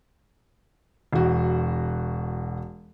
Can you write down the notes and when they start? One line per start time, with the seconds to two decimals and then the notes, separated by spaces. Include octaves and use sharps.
1.13 E1 F#4